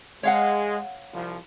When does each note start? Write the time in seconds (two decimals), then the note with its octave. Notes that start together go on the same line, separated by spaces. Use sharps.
0.23 G#3 C#5 F5 F#5
1.13 C2 F3